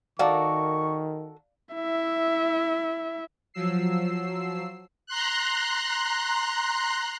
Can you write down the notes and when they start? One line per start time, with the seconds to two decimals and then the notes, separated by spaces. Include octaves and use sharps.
0.19 D#3 F#4 A4 A#4 D5 F5 C#6
1.75 E4 E5
3.54 F3 F#3 E6 C7
5.06 A#5 C6 F#6